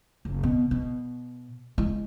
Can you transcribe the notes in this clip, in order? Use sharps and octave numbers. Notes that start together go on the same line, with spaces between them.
F#1
B2
B2
G#3 E4